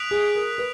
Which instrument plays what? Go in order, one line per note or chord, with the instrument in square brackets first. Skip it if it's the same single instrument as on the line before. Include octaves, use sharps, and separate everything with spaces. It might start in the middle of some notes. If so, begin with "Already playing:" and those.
Already playing: [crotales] D#6 F#6 B6 D7 F7
[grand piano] G#4
A#4
B4